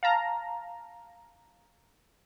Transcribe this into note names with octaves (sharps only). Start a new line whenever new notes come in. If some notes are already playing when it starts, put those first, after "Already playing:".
F5 A5 A#5